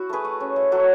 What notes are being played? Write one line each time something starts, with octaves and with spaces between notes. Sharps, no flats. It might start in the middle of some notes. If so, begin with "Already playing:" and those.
Already playing: E4 F#4
A3 G#4 B4
A3
C#4
A3
F#3 F#4 A4